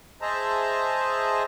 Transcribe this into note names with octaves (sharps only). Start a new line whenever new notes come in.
G#4 C5 D#5 E5 A5 A#5